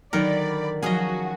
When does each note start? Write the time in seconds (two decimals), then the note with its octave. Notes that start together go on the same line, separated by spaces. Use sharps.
0.13 D3 D#3 F#3 D#4 A#4 D5 B5
0.83 F3 F#3 C#4 F#4 G#4 D#5